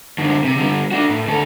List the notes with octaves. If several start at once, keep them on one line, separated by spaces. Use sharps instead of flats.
F#2 D3
C3
D3 G3
D4 F#4
A2
D2 A4